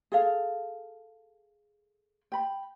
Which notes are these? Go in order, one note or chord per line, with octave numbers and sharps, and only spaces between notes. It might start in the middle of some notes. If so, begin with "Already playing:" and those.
G#4 A4 F5
G5 B5